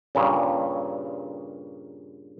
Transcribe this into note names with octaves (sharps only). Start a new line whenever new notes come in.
G2 A#2 C#3